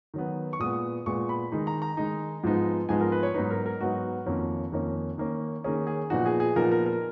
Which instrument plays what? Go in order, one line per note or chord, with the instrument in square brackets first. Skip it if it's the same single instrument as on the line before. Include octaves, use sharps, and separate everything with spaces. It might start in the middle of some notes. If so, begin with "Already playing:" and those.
[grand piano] D#3 F#3 B3
C#6
A#2 G#3 B3 D#6
A#2 G#3 B3 C#6
B5
D#3 G#3 D#4
A#5
A#5
D#3 G#3 D#4
G#2 F3 G#3 B3 D#4
G#2 F3 G#3 B3 D#4 G#5
A#4
B4
C#5
G#2 F#3 B3 D#4 B4
A#4
A#4
G#2 F#3 B3 D#4 F#4
F2 D#3 A#3 C#4
F2 D#3 A#3 C#4
D#3 A#3 C#4
D#3 A#3 C#4 G#4
G#4
A#2 F3 B3 D#4 F#4
G#4
G#4
A#2 F3 B3 D#4 A#4
A#4
A#4